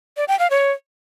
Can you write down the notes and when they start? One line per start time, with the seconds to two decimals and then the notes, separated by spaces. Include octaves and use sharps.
0.17 D5
0.28 G5
0.39 F5
0.50 C#5